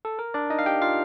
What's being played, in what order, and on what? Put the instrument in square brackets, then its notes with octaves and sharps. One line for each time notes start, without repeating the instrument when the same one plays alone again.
[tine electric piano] A4
A#4
D4 D5
D#4 D#5
F5
G4 G5
F4 F5